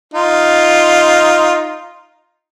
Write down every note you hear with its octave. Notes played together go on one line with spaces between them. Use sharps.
D#4 F4